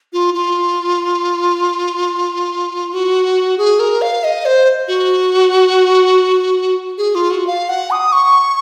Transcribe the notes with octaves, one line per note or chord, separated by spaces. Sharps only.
F4
F4
F#4
G#4
A#4
F5
D#5
C5
F#4
G#4
F4
F#4
F5
F#5
D#6
C#6